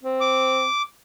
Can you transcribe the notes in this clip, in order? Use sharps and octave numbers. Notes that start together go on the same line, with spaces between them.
C4
D6